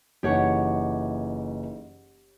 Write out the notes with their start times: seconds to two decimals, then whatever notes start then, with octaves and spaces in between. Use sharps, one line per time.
0.23 F#1 E3 D#4 G4 C#5 F#5